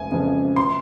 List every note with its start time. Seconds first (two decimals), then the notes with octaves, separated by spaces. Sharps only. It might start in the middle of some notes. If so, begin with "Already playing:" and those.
Already playing: F1 G#5
0.12 F2 C#3 F3
0.56 C6